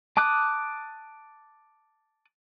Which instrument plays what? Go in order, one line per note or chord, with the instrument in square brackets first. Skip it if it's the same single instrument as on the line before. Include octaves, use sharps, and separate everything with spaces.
[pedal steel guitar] A5 D6 D#6 F#6